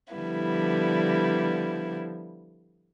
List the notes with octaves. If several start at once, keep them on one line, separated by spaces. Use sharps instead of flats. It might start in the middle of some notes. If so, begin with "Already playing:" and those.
D3 F3 G3 B3 E4